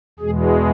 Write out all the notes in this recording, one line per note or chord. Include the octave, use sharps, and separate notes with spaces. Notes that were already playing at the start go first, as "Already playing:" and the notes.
E2 B2 G#3 G#4